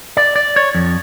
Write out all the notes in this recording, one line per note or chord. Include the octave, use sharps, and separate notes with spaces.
D5
D5
C#5
F2